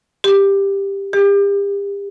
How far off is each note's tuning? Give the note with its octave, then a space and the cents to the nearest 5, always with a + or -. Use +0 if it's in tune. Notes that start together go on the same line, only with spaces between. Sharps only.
G4 +10
G4 +35